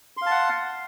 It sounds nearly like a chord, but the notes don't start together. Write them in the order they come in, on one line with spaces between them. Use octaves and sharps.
C6 F5 A5 F#5